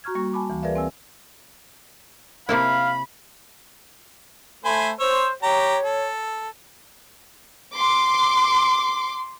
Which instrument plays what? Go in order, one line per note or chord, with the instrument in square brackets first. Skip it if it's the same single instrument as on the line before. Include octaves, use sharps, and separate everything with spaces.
[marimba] F#4 A#5 C#6 F6 G#6
G3 A#3 C#6
G#5 A5 B5 D6
D2 E3
G#4 A#4 B4 D5 E5 F5
C4 G#5 E6
[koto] C3 A#3 E4 [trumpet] F5 [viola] B5
[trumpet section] A3 [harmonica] C5 G#5 B5
[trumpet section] C5 [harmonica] C#5 E6
[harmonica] G4 A#5 [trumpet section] C#5
[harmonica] A4
[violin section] C6 D6